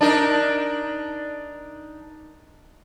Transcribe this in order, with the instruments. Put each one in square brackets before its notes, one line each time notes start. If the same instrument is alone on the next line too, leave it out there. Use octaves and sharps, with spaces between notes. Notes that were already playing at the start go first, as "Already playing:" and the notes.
[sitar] D4 D#4 A#4